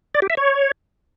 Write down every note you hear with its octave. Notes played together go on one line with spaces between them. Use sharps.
D5
G4
E5
C#5